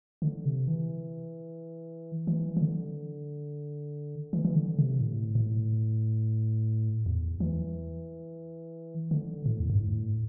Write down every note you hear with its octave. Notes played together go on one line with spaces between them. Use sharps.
D3
C3
E3
E3
E3
D3
E3
E3
D3
C3
A2
A2
E2
E3
D3
A2
E2
G2
A2